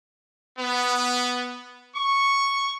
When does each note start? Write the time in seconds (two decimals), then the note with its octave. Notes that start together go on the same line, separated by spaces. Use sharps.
0.59 B3
1.96 C#6